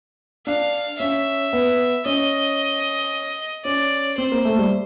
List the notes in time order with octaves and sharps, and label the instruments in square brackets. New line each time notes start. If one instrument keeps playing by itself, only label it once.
[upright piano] D4 [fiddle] F5
[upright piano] C#4 [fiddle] E5
[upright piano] B3
[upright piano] C#4 [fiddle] D#5
[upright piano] C#4 [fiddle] D5
[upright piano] C4 [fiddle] C5
[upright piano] A#3
A3
G3